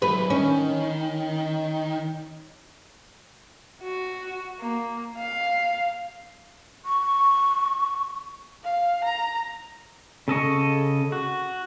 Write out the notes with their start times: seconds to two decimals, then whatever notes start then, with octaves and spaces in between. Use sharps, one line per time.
0.02 F#3 E4 B4
0.30 D#3 C#4
3.82 F#4
4.60 A#3
5.18 F5
6.85 C#6
8.63 F5
9.04 A#5
10.28 C#3 A4 D#5 C#6
11.12 F#4